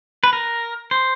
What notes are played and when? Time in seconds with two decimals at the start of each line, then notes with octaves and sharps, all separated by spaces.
0.24 B4
0.33 A#4
0.91 C5